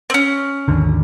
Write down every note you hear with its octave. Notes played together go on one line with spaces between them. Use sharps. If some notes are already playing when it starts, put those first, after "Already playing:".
C4 C#4
G#1 D#2 D3